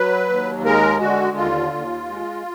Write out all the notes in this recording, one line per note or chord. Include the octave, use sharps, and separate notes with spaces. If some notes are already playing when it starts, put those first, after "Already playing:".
Already playing: F#3 B4
D#2
G#3 A#4
D3 F#4
D#2 F4
D#2
G#3